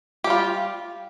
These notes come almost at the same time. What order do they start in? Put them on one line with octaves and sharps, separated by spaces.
G4 G3 F4